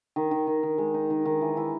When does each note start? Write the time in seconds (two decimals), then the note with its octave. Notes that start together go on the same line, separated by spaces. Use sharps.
0.16 D#3
0.31 D#3
0.47 D#3
0.63 D#3
0.78 G#3
0.94 D#4
1.10 D#3
1.25 D#3
1.41 E3
1.57 E4